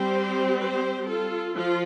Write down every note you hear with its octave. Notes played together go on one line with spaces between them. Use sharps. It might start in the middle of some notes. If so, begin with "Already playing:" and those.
Already playing: G3 C4 G4 C5
G4 C5
F4 A4
F3 F4